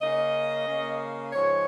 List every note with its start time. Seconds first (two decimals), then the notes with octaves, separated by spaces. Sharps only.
0.01 C#3 A#3 C#4 D#5
0.67 C#3 A#3 C#4
1.33 G#2 F3 G#3 C#5